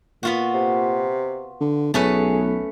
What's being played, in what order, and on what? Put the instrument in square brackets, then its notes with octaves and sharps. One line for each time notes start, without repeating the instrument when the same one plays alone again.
[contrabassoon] A#2 [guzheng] B3 F4 F#4
[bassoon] C3
[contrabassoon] D3
[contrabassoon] B1 [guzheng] A3 C#4 B4 [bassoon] G#4